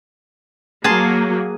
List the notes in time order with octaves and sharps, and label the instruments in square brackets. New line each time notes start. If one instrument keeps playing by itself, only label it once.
[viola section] F#3 A#3 [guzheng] G#4 A5 C6